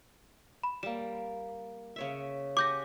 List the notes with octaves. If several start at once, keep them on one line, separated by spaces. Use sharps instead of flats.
B5
G3 A#3 E7
C#3 C#5 E5
G4 F#5 G#5 D6 G6 A#6